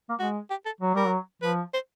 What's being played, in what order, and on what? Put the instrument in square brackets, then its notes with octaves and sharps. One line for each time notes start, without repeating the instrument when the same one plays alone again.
[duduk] A#3
[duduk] G#3 [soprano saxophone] F#4
[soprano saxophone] G4
A4
[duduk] F#3
[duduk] G3 [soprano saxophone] A#4
[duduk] F#3
[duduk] F3 [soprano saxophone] B4
[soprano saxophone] C5